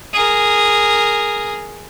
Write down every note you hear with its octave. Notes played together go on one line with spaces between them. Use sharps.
G#4 A#4